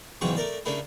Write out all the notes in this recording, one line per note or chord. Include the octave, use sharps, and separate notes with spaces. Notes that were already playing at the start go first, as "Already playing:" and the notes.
E2 G#2 C#3 F#3 C4 C#6
A3 A#4 D5
C#3 A3 A#3 D4 E4